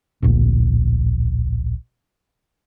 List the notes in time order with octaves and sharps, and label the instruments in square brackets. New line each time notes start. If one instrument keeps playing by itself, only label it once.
[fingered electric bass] D1 A#1